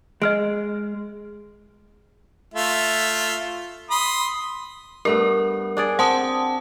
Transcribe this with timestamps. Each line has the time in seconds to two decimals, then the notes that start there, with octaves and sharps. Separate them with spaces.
0.22 G#3 D#5 F6 D7
2.54 A3 F4 E5
3.91 B5 C6 D#6
5.05 G2 A3 B3 A#4
5.77 D4 G#4 D5
5.99 C4 F#5 A5 D#6